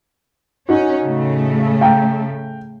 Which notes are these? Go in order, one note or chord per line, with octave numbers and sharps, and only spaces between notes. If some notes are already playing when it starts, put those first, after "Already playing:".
C#4 D#4 F#4
A2 C#3 A3
F5 G5 A#5